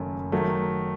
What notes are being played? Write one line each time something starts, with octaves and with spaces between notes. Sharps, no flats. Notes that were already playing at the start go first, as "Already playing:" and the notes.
Already playing: F#1 F#2 D#3 A3
D#3 F#3 A3